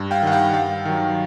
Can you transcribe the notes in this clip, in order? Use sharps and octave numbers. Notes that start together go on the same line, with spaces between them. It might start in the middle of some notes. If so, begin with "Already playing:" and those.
Already playing: G2
F5 G5
D#3 G3 F#5
F5 G5
G2 F5 G5
D#3 F#3